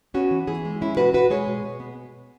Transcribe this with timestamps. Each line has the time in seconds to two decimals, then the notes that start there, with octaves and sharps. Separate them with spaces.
0.14 B3 C#4 F#4
0.31 E3
0.47 E3 E4 G#4
0.65 G#3
0.81 C#4 E4
0.97 B2 F#4 B4
1.14 B2 F#4 B4
1.30 G#3 G#4 C#5
1.48 B2
1.64 B2
1.80 B3